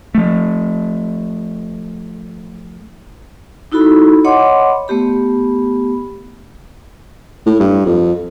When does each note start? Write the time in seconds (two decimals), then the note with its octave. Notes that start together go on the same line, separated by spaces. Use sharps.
0.15 F3 A3
3.72 D#4 E4 F#4 A4 B5
4.25 C#5 D#5 F#5 B5 C6 D6
4.88 A3 B3 G4 B5
7.46 A2
7.60 G2
7.86 F2